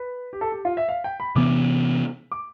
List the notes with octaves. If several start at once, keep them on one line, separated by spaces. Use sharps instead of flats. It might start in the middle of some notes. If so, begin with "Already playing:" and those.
Already playing: B4
G4
A4
G4
F4
E5
F5
G5
B5
C3 E3 B3 D6
D6